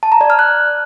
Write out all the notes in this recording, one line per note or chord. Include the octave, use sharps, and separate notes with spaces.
A5
A#5
D5
F6
F#6